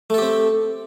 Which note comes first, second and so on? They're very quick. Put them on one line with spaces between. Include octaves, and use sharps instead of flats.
A3 A4 G4 C4